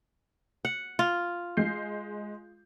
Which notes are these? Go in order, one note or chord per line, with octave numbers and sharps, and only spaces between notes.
F#5
F4
G#3 G6 C7